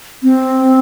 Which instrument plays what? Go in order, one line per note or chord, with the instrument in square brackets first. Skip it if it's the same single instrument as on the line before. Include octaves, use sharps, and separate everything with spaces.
[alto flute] C4